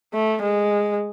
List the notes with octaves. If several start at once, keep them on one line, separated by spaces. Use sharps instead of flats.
A3
G#3